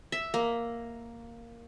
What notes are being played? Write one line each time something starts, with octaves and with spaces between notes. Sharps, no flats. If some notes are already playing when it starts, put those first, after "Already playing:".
E5
A#3